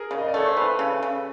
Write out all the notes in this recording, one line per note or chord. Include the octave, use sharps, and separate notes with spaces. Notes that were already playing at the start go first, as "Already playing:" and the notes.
Already playing: G#4 A#4
C#3
D#5
D5
A3 C#5
C5
E3 A4 B4
C#3
C#3